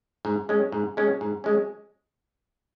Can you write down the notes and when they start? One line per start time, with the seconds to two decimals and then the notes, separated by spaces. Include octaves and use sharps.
0.25 G#2
0.49 G#3 C#4
0.72 G#2
0.97 G#3 C#4
1.21 G#2
1.44 G#3 C#4